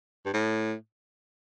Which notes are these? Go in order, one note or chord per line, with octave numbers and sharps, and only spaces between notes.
G2
A2